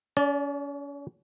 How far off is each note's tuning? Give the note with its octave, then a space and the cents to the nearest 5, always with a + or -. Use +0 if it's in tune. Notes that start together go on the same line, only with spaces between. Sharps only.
C#4 +35 D5 -20